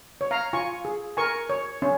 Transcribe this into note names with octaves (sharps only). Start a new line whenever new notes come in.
C#5
F5 A#5
F4 G#5 C#6
G#4
A#4 G#5 C#6
C#5
C#4